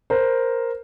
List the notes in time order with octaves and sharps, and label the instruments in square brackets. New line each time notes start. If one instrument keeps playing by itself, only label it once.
[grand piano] A#4 C5